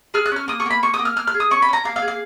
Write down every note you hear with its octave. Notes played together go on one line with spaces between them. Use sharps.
G#4 F6
F#6
C#4 F6
A#3 D#6
C#6
A#3 B5
A#3 C#6
D#6
A#3
F6
A#3 F6
F6
G#4
D#6
C#4 C#6
B5
C#4 A#5
A#3 F5
F5
G#4
F5